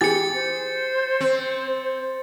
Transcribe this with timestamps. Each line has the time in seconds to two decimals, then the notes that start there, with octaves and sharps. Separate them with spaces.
0.01 E3 G4 G#4 A6 C#7
0.34 C5
1.20 C4